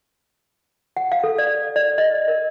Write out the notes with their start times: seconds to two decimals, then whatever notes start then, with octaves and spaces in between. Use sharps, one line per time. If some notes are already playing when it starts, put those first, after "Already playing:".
0.97 F#5
1.12 F5
1.24 A4
1.38 D5
1.76 D5
1.98 D#5
2.28 A#4